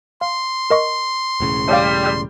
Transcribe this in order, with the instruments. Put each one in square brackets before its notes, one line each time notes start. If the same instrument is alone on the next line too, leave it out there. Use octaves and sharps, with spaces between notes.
[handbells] F5 [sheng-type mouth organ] C6
[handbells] A#4 D#5 C#6
[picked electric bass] E1 A2 C#3
[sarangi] G3 [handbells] C#5 F5